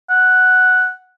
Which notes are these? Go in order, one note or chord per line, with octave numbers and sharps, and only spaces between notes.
F#5